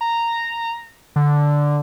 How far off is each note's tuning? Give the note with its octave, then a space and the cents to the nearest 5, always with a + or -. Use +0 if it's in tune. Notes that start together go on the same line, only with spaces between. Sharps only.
A#5 -10
D3 -5